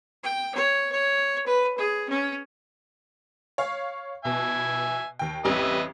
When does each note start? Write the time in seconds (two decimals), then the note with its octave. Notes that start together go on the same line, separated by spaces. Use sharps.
0.23 G5
0.55 C#5
0.92 C#5
1.46 B4
1.77 G#4
2.10 C#4
3.58 C#5 F5
4.25 B2 E5 G#5
5.19 D#2 G5
5.45 A1 F2 G3 B4 D#5 E5